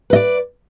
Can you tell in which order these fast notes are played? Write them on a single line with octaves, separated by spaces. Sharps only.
B4 D#5 D5